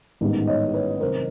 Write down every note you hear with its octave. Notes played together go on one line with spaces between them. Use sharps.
A1 G#2 D#3 G3 B3
C#5 D#5
B4 C#5
C2 C3 D#3 F#3 A#4 C5